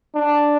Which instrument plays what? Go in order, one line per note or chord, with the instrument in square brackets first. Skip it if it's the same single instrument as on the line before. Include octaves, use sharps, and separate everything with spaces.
[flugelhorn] D4